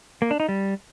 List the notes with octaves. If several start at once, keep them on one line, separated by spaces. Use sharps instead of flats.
A#3
D4
D#4
G3